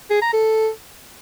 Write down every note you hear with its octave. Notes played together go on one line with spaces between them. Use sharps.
G#4
A#5
A4